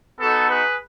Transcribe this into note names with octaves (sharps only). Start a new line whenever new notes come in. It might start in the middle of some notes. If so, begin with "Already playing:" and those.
B3 D#4 F#4 A4
G#4 B4